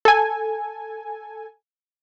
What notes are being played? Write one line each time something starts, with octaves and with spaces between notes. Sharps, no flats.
A4 G#5